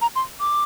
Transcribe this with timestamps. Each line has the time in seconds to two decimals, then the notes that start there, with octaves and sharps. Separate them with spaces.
0.01 A#5
0.16 C6
0.40 D6